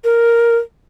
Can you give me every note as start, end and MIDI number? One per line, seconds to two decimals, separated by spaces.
0.04 0.56 70